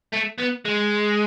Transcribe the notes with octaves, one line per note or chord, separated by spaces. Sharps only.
A3
B3
G#3